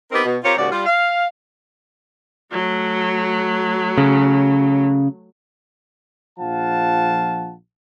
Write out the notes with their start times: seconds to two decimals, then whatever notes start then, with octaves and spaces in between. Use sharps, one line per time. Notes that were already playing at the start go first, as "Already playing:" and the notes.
0.12 B3 C4 D#4 G4 A#4
0.25 B2
0.44 C4 F4 G4 A#4 C#5
0.57 D#2 G#2 C#3 F#4 D5
0.72 G3 F4
0.86 F5
2.52 F#3 A3
3.97 C#3
6.39 A#1 F3 F5 F#5 A5